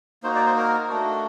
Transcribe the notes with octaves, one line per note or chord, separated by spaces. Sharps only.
A#3 D#4 F#4 C5
D5
C5
A#4
A3 D4 F#4